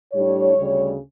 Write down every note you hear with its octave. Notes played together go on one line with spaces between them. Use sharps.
A2 G3 D4 C#5
D2 C#3 G3